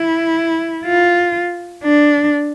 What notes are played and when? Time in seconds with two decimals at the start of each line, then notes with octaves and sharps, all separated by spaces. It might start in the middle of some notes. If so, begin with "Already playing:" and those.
Already playing: E4
0.85 F4
1.84 D4